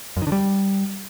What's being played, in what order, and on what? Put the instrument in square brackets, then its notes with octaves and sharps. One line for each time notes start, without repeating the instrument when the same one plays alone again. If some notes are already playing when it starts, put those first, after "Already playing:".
[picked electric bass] F#2
D#3
D3
G3